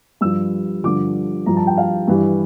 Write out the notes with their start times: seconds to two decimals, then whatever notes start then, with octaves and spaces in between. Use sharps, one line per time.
0.21 G2 F3 E6
0.84 G2 D3 F3 D6
1.46 G2 F3 A#5
1.57 A5
1.67 G5
1.77 F5
2.08 G2 E3 G3